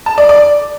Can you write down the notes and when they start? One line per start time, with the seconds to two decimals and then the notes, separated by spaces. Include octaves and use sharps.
0.06 A5
0.18 D5
0.29 D5